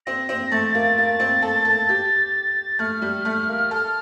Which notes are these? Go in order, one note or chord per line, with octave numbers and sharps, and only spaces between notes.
C4 A#6
C4
A3 A6
A#3
A#3
C4
A4
A4
G4
A3 F6
G3
A3
A#3
A4